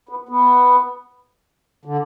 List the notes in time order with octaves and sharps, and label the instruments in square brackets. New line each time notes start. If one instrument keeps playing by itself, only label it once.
[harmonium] B3
B3
D3